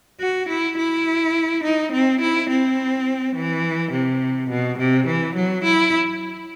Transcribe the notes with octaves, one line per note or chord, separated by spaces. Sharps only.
F#4
E4
E4
D#4
C4
E4
C4
E3
C3
B2
C3
E3
F#3
E4